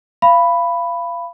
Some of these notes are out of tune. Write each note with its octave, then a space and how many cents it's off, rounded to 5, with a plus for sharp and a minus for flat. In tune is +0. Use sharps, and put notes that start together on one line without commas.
F5 -25 B5 +5